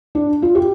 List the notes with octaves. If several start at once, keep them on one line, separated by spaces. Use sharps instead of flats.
D4
F4
G4